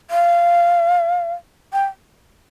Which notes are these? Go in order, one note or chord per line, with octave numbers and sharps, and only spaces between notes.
F5
G5